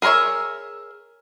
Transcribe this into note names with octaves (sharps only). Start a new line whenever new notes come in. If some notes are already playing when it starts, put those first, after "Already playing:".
G#4 A#4 B4 C#5 E5